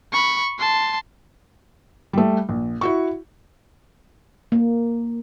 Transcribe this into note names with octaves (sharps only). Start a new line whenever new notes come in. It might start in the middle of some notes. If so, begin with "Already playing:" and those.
B5 C#6
A5 C6
G3 A3
A#1
E4 F#4 C#6
A#3